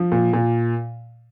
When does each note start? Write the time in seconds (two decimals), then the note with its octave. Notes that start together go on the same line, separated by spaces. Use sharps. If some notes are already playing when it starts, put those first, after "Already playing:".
Already playing: F3
0.12 A#2
0.33 A#2